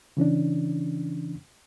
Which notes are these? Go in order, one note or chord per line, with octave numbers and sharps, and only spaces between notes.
C#3 E3 C#4 D4